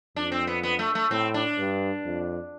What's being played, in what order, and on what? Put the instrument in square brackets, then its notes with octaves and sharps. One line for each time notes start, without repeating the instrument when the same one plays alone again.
[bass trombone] F2 [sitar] D4
[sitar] C4
B3
B3
A3
A3
[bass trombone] A2 [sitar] C4
[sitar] D4
[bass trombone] G2
F2